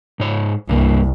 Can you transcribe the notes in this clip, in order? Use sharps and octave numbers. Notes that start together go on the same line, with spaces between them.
G#2 C#5
C2 G2 A#3